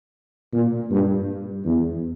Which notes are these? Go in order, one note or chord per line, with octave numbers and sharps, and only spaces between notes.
A#2
G2
E2